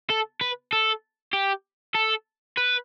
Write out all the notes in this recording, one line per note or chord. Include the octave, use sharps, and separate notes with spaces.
A4
B4
A4
G4
A4
B4